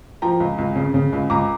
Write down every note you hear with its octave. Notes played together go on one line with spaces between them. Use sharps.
F3 G5 A#5
C#2
C#2
C#3
C#3
C#2
C#2 A#5 D6